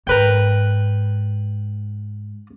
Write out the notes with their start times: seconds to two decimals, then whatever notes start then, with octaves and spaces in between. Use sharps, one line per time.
0.07 G#2 A#4 B4 G5